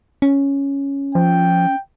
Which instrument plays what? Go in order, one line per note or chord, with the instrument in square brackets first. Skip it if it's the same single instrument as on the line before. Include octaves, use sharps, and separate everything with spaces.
[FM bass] C#4
[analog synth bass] F3 [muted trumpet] G5